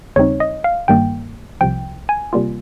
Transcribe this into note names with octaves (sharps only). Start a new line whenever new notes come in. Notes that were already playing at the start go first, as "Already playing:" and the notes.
D#2 C#3 G3 C4 D#4 C#5
D#5
F5
G1 G2 D#3 G3 A#3 G5
C2 C3 F3 G5
G#5
C3 G3 A#3 F4